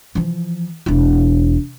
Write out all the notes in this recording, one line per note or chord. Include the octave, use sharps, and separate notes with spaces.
E3 F3
E1 E4